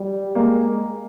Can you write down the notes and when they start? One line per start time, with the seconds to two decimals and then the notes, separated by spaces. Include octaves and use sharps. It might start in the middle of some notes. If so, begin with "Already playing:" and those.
Already playing: G3
0.35 G#3 A#3